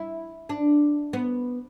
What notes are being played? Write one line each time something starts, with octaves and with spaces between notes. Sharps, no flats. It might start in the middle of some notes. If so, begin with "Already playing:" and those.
Already playing: E4
D4
B3